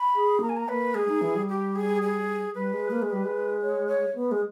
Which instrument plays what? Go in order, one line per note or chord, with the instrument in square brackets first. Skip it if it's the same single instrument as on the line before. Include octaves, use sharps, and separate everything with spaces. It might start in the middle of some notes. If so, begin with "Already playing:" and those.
Already playing: [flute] B5
[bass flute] G#4
[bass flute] A#3 [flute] A#5
[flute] G#5
A#5
[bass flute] A#3 [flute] B4
[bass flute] G#3 [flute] G#4
[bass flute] D#4
E3
G3
[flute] G4
G#4
G#4
[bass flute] G3 [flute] B4
[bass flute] G#3
A#3
G#3
[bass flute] G3 [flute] B4
[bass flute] G#3
[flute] C#5
C#5
[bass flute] B3
G#3